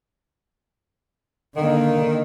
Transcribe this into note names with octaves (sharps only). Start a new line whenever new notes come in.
D3 D#3 A#3